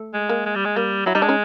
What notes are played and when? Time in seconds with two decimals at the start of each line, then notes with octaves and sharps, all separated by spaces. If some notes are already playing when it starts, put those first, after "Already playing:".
Already playing: A3
0.14 G#3
0.29 A#3
0.46 G#3
0.56 G3
0.65 G#3
0.76 G3 A#3
1.06 F#3 E4
1.15 G3 D#4
1.22 G#3 D4
1.29 C#4 D#4